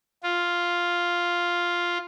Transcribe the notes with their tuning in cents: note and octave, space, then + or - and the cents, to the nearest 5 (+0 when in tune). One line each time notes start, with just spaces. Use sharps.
F4 +0